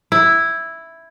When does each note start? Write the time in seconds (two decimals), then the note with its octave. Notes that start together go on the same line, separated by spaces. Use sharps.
0.12 E4